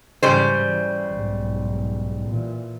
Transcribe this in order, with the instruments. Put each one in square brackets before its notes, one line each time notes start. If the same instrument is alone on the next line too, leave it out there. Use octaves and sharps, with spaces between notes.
[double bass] G#2 E3 [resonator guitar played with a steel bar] C#3 G3 C5
[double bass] E3
B1 G#2
A#2 E3